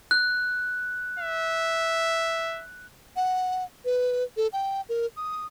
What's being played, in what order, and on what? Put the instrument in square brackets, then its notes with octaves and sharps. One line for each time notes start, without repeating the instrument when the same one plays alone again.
[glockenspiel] F#6
[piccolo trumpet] E5
[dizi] F#5
B4
A4
G5
A#4
D#6